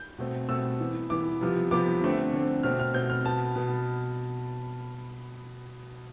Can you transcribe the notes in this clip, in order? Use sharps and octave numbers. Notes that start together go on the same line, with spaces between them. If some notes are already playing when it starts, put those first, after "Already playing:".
Already playing: G6
B2 A3 C4
B2 A3 C4 E6
E3 B3
E3 B3 D6
C3 F3 B3
C3 F3 B3 D6
D3 A3 C4
D3 A3 C4
B2 A3 C4 F6
F6
B2 A3 C4 G6
F6
B2 B3 A5
B2 B3